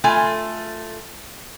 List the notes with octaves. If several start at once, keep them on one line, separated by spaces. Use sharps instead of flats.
A3 F4 G#5